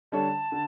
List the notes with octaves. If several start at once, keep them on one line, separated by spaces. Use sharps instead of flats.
D3 G3 D4 A4 C#5 A5
D3